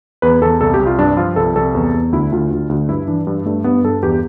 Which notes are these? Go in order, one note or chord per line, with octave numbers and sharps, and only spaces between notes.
E2 B4
E2 A4
C2 A4
G4
C2
F4
G2 D4
F3 F4
C2 A4
C2 A4
E2
E2
D2 E4
D2 F4
D2
D2
G2 E4
E3 D4
G2
G2 A3
G2 B3
G2 A4
E2 G4